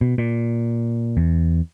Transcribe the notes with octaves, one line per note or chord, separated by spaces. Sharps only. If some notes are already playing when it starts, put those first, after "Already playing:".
B2
A#2
E2